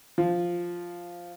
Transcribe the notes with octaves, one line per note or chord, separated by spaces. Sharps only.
F3